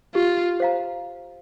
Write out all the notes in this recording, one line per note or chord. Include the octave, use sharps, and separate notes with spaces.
F4 G4
C5 F5 A#5